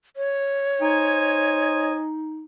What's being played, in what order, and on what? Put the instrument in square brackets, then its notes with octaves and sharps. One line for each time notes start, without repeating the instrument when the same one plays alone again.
[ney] C#5
[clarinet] D#4 [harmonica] C5 D#5 G#5